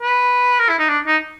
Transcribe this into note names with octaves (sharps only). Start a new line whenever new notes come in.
B4
A#4
E4
D#4
D4
D#4